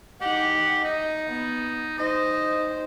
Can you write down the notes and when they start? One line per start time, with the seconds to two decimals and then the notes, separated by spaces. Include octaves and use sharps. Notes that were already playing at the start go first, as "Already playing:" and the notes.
0.22 D#4 G4 F#5
0.85 D#4 D#5
1.28 B3
1.98 D#4 C5 D#5